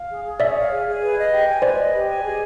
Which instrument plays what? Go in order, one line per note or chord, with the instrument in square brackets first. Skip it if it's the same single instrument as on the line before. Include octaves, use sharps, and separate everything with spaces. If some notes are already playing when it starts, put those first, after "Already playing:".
Already playing: [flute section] F5
G#4
G#4
[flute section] C#5 [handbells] D5 E5
[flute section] F5
G#4
G#4
B4
D#5
G4
G#5
[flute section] B4 [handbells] C5 D5
[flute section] D#5
G4
G#5
G#4